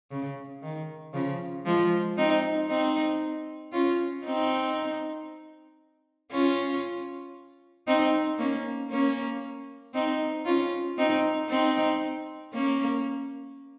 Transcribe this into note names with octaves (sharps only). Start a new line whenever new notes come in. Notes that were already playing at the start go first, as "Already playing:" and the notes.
C#3
D#3
C#3 F3
F3 G#3
C4 D#4
C4 D#4
C#4 F4
C4 D#4
C#4 F4
C4 D#4
A#3 C#4
A#3 C#4
C4 D#4
C#4 F4
C4 D#4
C4 D#4
A#3 C#4